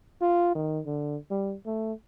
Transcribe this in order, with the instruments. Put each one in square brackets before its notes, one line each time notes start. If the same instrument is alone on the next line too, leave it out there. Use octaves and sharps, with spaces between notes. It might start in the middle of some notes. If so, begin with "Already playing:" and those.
[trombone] F4
D#3
D3
G3
A3